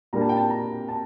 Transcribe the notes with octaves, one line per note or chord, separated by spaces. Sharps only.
A#2 G3 A#3 D4 A#5
A5
G5
A5
A#5
A5